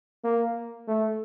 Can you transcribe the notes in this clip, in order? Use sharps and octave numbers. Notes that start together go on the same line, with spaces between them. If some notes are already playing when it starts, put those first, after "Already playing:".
A#3
A3